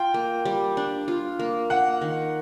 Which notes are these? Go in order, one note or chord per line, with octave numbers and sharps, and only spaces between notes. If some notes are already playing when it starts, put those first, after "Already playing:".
Already playing: F4 G5
A#3
G3
D4
F4
A#3
A#3 F#5
D#3